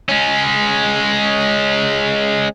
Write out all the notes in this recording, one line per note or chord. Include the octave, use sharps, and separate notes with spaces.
G#3 C#4